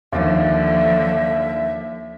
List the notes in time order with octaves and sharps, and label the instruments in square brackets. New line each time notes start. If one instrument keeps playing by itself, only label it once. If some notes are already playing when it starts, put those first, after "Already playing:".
[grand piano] D#2 [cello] D3 F3 [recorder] E5